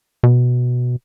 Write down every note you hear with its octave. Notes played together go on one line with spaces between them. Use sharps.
B2